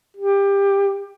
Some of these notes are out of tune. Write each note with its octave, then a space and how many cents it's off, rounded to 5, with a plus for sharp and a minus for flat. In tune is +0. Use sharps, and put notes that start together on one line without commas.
G4 +20